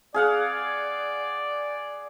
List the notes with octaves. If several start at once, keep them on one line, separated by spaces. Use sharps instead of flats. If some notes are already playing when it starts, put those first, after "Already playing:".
G#4 D5 F5 F#5